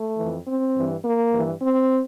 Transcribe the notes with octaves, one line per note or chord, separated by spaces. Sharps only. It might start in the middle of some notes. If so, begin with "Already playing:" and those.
Already playing: A3
F2 E3
C4
G2 E3
A#3
G2 E3
C4